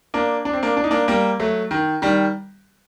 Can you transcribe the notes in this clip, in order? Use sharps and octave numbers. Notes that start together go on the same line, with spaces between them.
A#3 D4
D4
C4
A#3 D4
D4
D#4
A#3 D4
G3 A#3
F#3 A3
D#3
D#3 G3